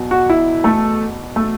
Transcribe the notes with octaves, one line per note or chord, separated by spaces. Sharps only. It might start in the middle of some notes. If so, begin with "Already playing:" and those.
Already playing: E2 B2 F#3
F#4
E4
A3 A4
A3 A4